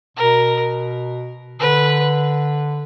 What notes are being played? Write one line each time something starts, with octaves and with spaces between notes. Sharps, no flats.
B2 A#4
D3 B4